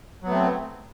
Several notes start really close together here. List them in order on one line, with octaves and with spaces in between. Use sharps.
F#3 B3 A3 C4